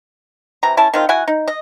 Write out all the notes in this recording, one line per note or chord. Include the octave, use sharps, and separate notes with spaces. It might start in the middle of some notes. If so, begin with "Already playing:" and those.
C3 E3 A#5
C#4 E4 A5
D#3 C4 F4
E4 F#4 F#5 G#5
D#4
D#5